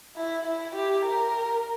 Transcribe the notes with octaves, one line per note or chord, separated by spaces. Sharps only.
E4
E4
G4
A#4